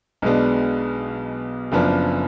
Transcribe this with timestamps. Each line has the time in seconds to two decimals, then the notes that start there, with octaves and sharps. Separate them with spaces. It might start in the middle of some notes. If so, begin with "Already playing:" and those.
0.22 B1 B2 G#3 B3 D4
1.72 F#1 F#2 F3 B3 D4